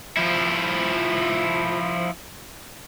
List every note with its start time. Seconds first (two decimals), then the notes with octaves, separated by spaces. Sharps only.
0.17 F3 E4